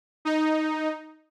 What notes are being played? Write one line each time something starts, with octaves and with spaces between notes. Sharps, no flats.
D#4